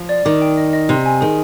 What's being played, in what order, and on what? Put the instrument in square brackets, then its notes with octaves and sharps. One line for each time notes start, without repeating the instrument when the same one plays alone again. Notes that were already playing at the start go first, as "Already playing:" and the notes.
Already playing: [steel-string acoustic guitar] F3
[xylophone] D5
[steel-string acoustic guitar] D#3 [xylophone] D6
[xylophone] G5
D#5
D#5
[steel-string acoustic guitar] C3 [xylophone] C6
[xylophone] G#5
[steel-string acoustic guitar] D#3 [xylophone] G#4